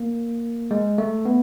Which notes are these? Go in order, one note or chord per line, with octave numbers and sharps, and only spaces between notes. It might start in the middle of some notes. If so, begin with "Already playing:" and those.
Already playing: A#3
G#3
A3
B3